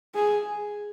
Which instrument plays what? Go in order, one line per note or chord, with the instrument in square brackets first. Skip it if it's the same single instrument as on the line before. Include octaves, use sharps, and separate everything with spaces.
[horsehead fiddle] G#4